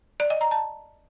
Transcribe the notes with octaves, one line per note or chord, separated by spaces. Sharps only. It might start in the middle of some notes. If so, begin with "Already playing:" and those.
D5
D#5
A#5
A5